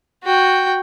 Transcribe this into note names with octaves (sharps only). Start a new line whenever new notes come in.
F#4 G5